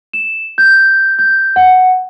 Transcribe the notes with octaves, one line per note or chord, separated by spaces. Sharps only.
E7
G6
G6
F#5